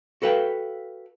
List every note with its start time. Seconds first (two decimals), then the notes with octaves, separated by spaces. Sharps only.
0.22 F#4 A4 B4 F5 G5